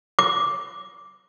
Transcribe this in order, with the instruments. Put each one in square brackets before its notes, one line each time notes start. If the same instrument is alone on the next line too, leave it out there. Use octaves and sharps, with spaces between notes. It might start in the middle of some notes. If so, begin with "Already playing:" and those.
[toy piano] D6